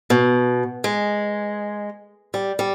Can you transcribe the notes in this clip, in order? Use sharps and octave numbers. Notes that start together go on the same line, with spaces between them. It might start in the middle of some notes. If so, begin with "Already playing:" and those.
B2
G#3
G3
G3